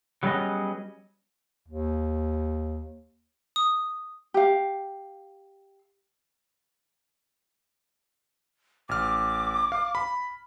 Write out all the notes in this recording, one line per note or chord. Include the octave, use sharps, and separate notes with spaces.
F#3 G3 B3 C#4 G#4 D#5
D#2
D#6
G4 F5
A1 D6 F6
F5
B5